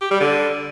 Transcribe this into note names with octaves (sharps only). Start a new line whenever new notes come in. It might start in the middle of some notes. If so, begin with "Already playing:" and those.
G4
G3
D3